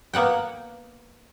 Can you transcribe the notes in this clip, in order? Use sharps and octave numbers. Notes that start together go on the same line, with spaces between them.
A#3 B3 F#5 G5